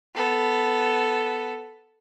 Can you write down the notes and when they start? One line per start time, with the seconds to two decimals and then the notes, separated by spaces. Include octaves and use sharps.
0.15 B3 A4